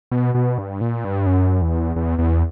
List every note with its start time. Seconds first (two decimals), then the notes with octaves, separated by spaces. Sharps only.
0.12 B2
0.35 B2
0.58 G2
0.81 A#2
1.04 G2
1.26 F#2
1.62 E2
1.96 E2
2.19 E2